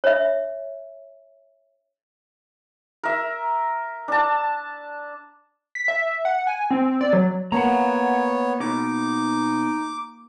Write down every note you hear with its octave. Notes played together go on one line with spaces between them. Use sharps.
C#5 E5
A#4 E5
D4 A5
B6
E5
F#5
G#5
C4
D5
F#3
A#3 B3 C#5 F#5 A#5
B2 D#4 D6